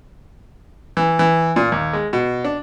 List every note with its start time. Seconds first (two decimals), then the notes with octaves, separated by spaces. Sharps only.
0.97 E3
1.19 E3
1.56 A#2
1.72 D#2
1.93 G#3
2.13 B2
2.44 D4